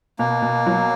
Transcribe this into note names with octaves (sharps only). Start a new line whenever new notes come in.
B2 A#3
B2
F#3